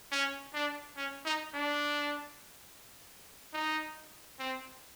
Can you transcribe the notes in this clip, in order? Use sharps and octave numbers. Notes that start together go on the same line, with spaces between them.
C#4
D4
C#4
D#4
D4
D#4
C4